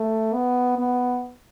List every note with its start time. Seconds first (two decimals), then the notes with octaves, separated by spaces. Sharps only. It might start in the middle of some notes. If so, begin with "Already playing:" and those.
Already playing: A3
0.34 B3
0.78 B3